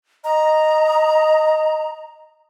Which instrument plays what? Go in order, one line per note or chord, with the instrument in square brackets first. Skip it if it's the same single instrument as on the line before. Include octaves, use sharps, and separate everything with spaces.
[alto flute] D#5 [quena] A#5